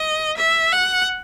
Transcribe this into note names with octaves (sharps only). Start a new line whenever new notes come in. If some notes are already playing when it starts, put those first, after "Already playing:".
Already playing: D#5
E5
F#5